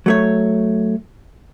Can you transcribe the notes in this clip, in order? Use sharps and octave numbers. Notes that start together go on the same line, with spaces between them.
F#3 A3 C#5